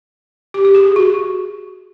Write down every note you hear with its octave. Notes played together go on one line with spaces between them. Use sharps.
G4
G4
G#4
F#4